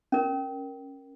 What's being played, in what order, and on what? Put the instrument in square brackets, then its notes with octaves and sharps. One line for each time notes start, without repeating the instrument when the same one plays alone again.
[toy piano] C#4 A#4